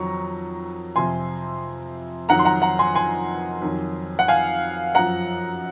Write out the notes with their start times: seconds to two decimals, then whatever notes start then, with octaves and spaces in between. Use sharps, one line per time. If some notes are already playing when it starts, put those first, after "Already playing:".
Already playing: F2 D#3 F#3 A#5 C#6
0.96 F2 C3 F3 G#5 C6
2.29 F2 D#3 F#3 F#5 A#5
2.39 C6
2.45 F#5 A#5
2.62 F#5 A#5
2.79 G#5 C6
2.95 G#5 C6
3.62 F2 D#3 F#3
4.19 F#5
4.28 F5 G#5
4.95 F#2 F3 F#5 A#5